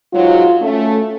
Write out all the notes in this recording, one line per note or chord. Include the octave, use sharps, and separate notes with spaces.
G#2 F#3 F4
A3 C#4